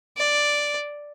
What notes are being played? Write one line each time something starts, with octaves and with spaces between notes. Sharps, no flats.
D5